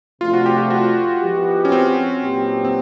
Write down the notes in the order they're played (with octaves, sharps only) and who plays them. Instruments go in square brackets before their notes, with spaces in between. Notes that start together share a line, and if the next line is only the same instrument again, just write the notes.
[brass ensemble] C3 F3 A3 D4 [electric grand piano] F4
[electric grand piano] F#4
G4
G4
F#4
[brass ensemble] F3 G#3 B3 E4 G4
[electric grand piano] C#4
C4
[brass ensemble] A#2 F#3 B3 D#4 G4
[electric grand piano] C4